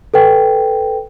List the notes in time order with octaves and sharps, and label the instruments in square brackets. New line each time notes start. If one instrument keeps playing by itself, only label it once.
[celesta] A4 B4 G5